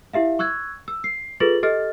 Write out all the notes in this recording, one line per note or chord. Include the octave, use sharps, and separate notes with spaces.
E4 G4 E5 F5
C#6 E6 F#6 G#6
E6
C7
F4 G#4 A4 B4 A6 F#7
G4 A4 D#5 F6 A6